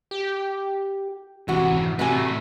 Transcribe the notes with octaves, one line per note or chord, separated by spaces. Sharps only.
G4
A1 G#2 C3 E3 F#4
F1
A2 C3 A3 F#4 B4 G#5